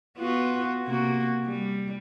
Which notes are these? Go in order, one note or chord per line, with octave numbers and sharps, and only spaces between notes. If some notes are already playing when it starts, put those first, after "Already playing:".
B3 F4 F#4
C3 A#3 F#4
G3